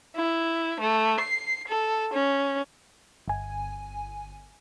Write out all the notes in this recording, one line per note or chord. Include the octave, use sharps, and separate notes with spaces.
E4
A3
C7
A4
C#4
G1 G#5